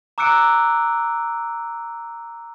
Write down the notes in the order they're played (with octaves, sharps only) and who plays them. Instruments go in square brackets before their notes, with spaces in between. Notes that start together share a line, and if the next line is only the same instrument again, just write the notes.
[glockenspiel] A#5 D6 E6 F#6 C#7 D7